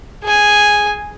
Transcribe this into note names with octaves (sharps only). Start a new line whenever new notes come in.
G#4 G#5